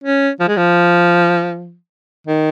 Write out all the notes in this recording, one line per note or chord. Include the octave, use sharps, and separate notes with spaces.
C#4
F3
G#3
F3
D#3